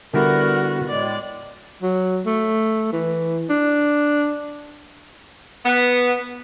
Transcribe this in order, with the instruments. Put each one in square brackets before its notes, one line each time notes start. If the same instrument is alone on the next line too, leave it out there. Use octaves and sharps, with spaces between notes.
[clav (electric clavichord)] D3 G3 E4 [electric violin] B3 F#4 [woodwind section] A#4
[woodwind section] A2 G#3 [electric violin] D5
[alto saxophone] F#3
A3
E3
D4
[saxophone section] B3